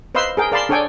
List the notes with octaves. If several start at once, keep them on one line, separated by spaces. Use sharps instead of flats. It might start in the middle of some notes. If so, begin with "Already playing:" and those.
B4 C5 D#5 F5 C6 E6
G#4 A#4 G5
A#4 D5 F5 A5 B5 C6
D4 A4 C#5 D5 G5 G#5